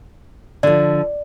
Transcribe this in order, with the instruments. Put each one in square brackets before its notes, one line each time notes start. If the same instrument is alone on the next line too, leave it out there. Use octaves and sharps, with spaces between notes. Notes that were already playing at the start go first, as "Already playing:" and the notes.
[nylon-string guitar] D3 F3 [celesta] D5